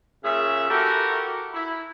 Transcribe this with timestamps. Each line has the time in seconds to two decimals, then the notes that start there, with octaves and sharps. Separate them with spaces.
0.23 A#2 C#3 C#4 G#4 E5
0.69 E4 F#4 G4 A4 A#4
1.54 E4